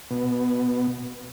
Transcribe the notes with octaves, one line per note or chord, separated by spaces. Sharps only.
B2